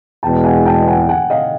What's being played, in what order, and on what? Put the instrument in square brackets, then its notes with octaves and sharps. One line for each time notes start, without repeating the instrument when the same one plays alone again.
[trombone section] E2 B2 G#3 [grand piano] G5 A5
[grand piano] F#5 G#5
G#5
G5 A5
F#5 G#5
F#5 G#5
D#5 F5